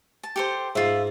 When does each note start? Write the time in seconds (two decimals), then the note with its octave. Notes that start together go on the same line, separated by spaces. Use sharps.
0.23 A5
0.36 G4 A4 C5
0.76 G#2 F4 E5